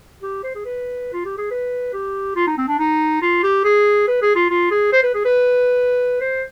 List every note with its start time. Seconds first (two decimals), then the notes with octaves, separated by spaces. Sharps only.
0.22 G4
0.43 C5
0.55 G#4
0.65 B4
1.13 F4
1.25 G4
1.37 G#4
1.51 B4
1.93 G4
2.36 F4
2.47 D#4
2.58 C4
2.68 D4
2.79 D#4
3.22 F4
3.43 G4
3.64 G#4
4.08 B4
4.22 G#4
4.36 F4
4.50 F4
4.71 G#4
4.93 C5
5.03 B4
5.14 G#4
5.25 B4
6.21 C5